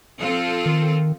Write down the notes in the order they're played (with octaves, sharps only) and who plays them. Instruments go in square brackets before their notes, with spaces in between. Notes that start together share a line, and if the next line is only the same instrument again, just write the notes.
[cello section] F3 C4 F4 A4
[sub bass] D#3